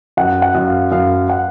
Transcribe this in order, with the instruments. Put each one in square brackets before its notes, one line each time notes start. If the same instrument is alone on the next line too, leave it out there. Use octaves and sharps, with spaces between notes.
[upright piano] F#2 [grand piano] F#5
[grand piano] F#5
[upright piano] F#2
[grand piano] F5
[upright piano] F#2 [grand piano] F5
[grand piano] F#5